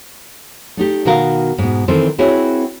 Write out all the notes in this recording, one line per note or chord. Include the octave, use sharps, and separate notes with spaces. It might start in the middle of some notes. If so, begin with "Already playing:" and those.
A3 D#4 G4
B2 D#3 F#4 A#4 C5 F5
G#2 B2
D#3 E3 C4 A4 C5
C4 E4 F#4 G#4 B4 C#5